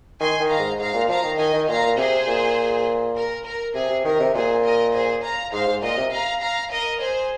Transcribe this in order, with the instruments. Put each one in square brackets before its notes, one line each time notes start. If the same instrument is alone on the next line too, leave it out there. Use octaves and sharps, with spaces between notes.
[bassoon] D#3 [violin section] G#5 C6
[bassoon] D#3
[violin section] F5 A#5
[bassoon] G#2
[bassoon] G#2 [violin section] F5 A#5
[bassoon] A#2
[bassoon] F3 [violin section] F5 A#5
[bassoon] D#3
[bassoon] D#3 [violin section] D#5 G#5
[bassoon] D#3
[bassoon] A#2 [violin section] F5 A#5
[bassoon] A#2
[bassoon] C3 [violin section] G#4 C5
[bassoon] A#2
[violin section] A#4
A#4
[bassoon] C3 [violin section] G#4
[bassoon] C3
[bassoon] D#3 [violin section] A#4
[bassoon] C3
[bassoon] A#2 [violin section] G#4 C5
[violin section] A#4 D#5
G#4 C5
F5 A#5
[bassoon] G#2 [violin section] C5 F5
[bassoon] G#2
[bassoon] A#2 [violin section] A#4 D#5
[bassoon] C3
[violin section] F5 A#5
F5 A#5
A#4 D#5
G#4 C5